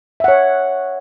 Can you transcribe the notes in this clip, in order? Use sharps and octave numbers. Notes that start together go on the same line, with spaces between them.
C#5 E5 F#5